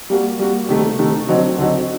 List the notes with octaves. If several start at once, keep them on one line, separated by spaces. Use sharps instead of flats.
G3 A#3 F#4
G3 A#3 F#4
C3 D#3 A3
C3 D#3 A3
D3 F#3 C4 D#4 F#4
D3 F#3 C4 D#4 F#4